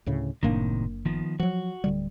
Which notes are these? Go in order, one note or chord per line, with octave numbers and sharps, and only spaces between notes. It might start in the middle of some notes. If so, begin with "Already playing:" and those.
D2 A2 C#3
F#1 A2 C3 D#3 A#3 D4
D#3 F3 B3
F3 F#3 F#4
D1 D3 G3